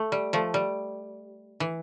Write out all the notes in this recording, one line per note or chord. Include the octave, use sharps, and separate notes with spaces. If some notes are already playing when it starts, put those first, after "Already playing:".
Already playing: A3
G3
F3 A3
G3
E3